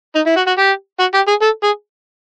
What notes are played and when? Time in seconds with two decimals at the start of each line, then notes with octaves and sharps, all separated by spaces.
0.15 D#4
0.26 E4
0.36 F#4
0.47 F#4
0.58 G4
0.99 F#4
1.14 G4
1.28 G#4
1.42 A4
1.63 G#4